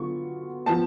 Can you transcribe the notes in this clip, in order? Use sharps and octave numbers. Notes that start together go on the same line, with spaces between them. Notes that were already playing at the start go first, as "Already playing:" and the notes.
Already playing: D3 F#3 B3 F4 C#6
F3 B3 A5